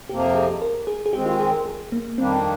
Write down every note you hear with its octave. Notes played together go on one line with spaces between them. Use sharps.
F2 C3 F3 A#3 G4
G#4
A#4
G#4
G#4
D#3 G#3 C4 G4
F4
G#4
A#4
G#4
A#3
F2 D#3 G3 A#3 C4 D4